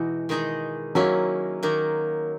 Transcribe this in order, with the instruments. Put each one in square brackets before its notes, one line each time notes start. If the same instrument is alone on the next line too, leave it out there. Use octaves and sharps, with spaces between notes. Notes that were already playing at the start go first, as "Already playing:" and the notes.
Already playing: [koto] B2 G#3 D#4 F#4 [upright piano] E3
[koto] D#3 G#3 D#4 G#4 D#5
[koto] D#3 A#3 C#4 E4 [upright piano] F#3
[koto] D#3 A#3 D#4